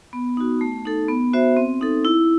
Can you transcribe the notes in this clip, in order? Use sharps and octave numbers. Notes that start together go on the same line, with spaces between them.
B3
D#4 F#4
A3
D#4 A4
B3
F#4 C5 E5
C4
D#4 A4
E4